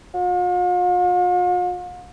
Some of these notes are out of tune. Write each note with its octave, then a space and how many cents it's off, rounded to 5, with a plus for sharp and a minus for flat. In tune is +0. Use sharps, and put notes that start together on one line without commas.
F4 +45